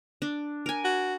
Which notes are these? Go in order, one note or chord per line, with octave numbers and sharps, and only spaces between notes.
D4
A#4 G#5
F#4